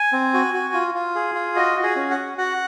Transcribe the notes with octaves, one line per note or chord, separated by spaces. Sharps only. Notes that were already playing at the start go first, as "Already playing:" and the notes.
Already playing: G#5
C4
F#4
F#4
F4
F4
G#4
F4
F#4 D#5
F#4
G#4
C#4
F#5
F#4
F#4 F#5